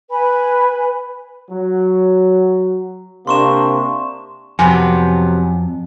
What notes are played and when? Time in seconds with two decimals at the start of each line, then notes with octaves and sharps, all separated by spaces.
0.11 B4 G#5 B5
1.51 F#3
3.27 C3 A#3 D4 C6 C#6 E7
4.59 F2 C3 F#3 B3 G#5